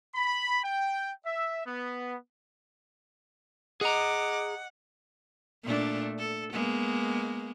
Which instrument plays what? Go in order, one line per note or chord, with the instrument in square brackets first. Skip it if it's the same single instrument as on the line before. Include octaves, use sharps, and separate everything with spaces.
[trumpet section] B5
G5
E5
B3
[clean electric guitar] G#4 A#5 [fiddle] D#5 D6 [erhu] F#5
[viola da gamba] A#2 A3 D4
A4
G#3 A#3 B3